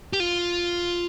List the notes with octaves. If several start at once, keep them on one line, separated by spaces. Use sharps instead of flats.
G4
F4